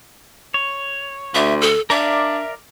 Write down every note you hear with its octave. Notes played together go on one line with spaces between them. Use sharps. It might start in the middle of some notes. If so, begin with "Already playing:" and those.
C#5
D2 E5
A4
D4 A#4 D5 E5 F5